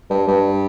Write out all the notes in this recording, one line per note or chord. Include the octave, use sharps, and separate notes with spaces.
G2
G2